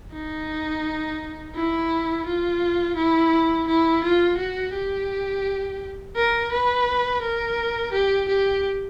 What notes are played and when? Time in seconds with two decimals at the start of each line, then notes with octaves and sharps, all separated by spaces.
0.13 D#4
1.55 E4
2.26 F4
2.96 E4
3.67 E4
4.04 F4
4.38 F#4
4.74 G4
6.16 A#4
6.52 B4
7.22 A#4
7.92 G4
8.28 G4